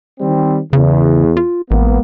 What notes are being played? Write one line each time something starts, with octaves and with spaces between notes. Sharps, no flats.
D#3 G3 C4
E2 C#3
F4
A1 G#3 A#3 B3